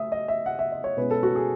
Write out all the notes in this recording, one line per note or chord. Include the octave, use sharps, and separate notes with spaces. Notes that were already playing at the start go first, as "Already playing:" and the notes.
Already playing: A3 E5 D#6
D#5
E5
F#5
E5
D#5
C#5
B2 G#3 C#4 E4 B4
A4
F#4
G#4